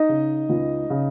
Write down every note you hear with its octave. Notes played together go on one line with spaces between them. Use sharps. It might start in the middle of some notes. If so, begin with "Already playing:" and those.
Already playing: D#4 D#5
C#3
C#2
C#3